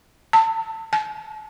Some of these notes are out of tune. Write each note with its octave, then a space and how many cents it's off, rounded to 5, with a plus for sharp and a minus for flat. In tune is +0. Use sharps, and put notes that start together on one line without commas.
A5 +25
A5 -40